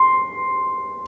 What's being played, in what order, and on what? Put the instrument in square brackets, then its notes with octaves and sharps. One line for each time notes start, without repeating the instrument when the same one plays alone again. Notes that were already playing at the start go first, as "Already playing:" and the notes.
Already playing: [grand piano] C6